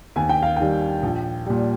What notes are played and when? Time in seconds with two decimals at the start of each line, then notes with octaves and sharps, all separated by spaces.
0.16 D#2 G#5
0.29 G5
0.43 F5
0.56 D#3 G3 G5
1.03 A#1
1.47 A#2 G3